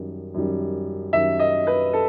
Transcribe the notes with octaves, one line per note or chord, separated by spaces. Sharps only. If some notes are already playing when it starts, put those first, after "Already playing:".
Already playing: F#2 D#3 G3
F#2 D#3 G3
F#2 D#3 G3 E5
D#5
B4
A4